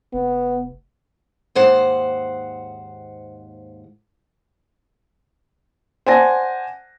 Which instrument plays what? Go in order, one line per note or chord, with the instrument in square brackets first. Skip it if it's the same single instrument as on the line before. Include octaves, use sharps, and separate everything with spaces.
[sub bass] F1 [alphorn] B3
[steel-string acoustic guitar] D#2 G#2 C5 F#5
[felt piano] C5 D5 F#5 G#5 A5 A#6